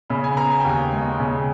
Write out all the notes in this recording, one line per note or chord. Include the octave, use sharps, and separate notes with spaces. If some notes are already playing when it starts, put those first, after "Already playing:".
C#3 B5
G#5
B3 A#5
G#5
G5
D#2 G#5
G#3
C#3